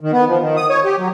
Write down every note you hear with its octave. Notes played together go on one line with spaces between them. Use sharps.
D#3
B3
F3
D#3
D#6
C#5
G4
F#3